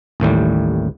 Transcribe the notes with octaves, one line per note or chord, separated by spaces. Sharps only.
A1 D#2 A2 G3